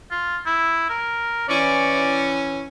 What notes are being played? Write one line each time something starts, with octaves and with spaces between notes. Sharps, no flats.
F4
E4
A#4
E3 C#4 D5